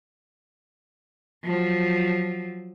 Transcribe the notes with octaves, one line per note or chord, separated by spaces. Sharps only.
F3 F#3